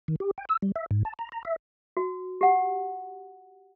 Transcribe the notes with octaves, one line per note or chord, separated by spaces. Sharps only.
D#3
G4
G5
E6
G3
E5
G#2
A5
A#5
A#5
E5
F#4
G4 F#5